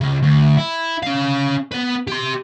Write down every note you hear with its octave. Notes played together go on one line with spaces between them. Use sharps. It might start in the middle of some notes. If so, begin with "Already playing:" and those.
C#3 G#3
D2
E4
C#4 F5
B3 B4
G4 C6